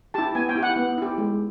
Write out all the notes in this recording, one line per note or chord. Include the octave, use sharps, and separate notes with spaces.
E4 G4 A5
B3 G#5
G5
E4 G4
F#5
B3
E4 G4
G#3